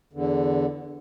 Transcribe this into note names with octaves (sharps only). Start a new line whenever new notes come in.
E2 D3